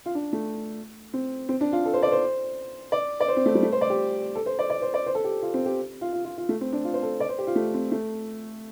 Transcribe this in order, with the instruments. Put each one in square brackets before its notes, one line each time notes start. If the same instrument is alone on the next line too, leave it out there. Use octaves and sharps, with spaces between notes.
[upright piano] F4
D4
A3
C4
C4
D4
F4
A4
C5
D5
C5
D5
D5
C5
C4
A3
G3
A3
C5
D5
G4
A4
C5
D5
D5
C5
D5
C5
A4
G4
F4
C4
G4
F4
F4
F4
F4
A3
C4
D4
F4
C5
A4
D5
C5
G4
F4
A3
C4
A3